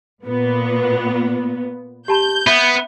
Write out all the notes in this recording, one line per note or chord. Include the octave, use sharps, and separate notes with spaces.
A#2 B3
G4 A5 B5 G6
B3 E5